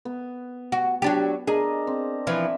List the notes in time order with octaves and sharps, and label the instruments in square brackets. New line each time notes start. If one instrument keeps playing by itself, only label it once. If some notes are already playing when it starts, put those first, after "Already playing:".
[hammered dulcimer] B3
[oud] F#4
F#3 D4 G4
[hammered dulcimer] D4 A#4 D#5 [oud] G#4
[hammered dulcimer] C4
[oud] E3 F3 [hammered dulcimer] E5